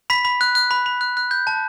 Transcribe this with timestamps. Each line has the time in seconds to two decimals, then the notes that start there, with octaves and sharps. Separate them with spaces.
0.10 B5 B6
0.25 B5
0.41 F#6
0.55 F#6
0.71 B5
0.86 B5
1.01 F#6
1.17 F#6
1.31 G6
1.47 A5